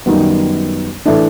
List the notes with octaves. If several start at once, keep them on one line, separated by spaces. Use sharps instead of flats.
F#2 D#3 G3 B3
A2 E3 A3 D4